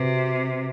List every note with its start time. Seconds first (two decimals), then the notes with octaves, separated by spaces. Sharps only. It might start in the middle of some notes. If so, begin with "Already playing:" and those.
Already playing: C3 F#4 B4